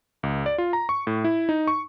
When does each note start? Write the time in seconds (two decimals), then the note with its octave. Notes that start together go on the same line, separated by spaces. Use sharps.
0.23 C#2
0.46 D5
0.58 F4
0.73 A#5
0.89 C#6
1.07 A2
1.24 E4
1.49 D#4
1.67 C#6